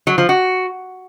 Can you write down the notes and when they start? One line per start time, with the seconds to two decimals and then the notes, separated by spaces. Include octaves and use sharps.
0.07 F#3
0.18 F3
0.29 F#4